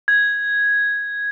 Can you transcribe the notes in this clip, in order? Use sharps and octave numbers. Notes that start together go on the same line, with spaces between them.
G#6